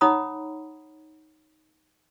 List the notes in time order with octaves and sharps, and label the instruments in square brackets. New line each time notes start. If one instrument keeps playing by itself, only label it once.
[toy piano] D#4 C#5 F#5 A#5 B5 D#6